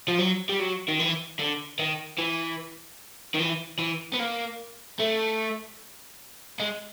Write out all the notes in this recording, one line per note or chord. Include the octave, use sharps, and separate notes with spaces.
F3
F#3
G3
F#3
D#3
E3
D3
D#3
E3
D#3
E3
E3
B3
A#3
A3
G#3